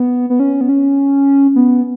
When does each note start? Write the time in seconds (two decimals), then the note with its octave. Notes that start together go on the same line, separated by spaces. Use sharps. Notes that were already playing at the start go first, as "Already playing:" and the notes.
Already playing: B3
0.30 B3
0.40 C#4
0.61 B3
0.69 C#4
1.56 B3